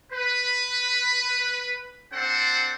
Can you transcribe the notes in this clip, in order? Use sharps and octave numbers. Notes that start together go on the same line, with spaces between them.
B4
C4 D4 A4 C5 F#5